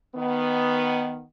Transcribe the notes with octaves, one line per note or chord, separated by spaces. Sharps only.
D#3 B3